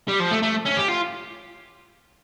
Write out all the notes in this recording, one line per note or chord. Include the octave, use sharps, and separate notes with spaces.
G3
F3
A3
A3
C#4
G4
F4